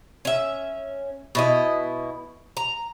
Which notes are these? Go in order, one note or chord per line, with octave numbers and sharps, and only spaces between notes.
C#4 E5
B2 E4 D#5
A#5